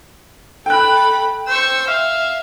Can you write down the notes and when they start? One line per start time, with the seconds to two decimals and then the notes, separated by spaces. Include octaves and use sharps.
0.66 A4 G5 B5 F#6
1.48 C5 C#6 E6
1.88 E5 F5